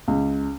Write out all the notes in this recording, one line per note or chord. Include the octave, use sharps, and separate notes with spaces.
C#2